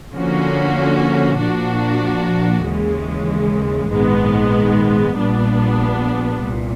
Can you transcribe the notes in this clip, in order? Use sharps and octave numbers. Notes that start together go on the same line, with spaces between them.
D3 F3 A#3 C#4 F#4
A#2 F3 A#3 D4 F#4
D#2 C#3 E3 G#3
A#1 G#2 D#3 G#3 B3
A#1 A#2 G3 B3 D4
C2 A#2